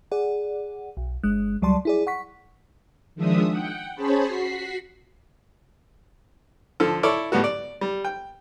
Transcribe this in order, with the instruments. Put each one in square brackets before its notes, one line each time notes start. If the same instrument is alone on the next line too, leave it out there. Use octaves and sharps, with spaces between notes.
[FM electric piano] G#4 D5 F#5
B1
G1 G#3 F#6
C#2 F#3 G3 D5 A5 C6
E4 G#4 D5
F#5 C#6 B6
[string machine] D#3 F3 G#3 D4 E5 D#6
F#5 G5
C#4 G#4 C5 C#5 A5 B5
F#4 B6 C7
[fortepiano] D3 F3 A4
E4 A4 C#5 D5
A2 G3 B3 F#4
D5
G3
G5